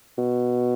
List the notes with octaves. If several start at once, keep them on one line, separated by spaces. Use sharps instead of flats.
B2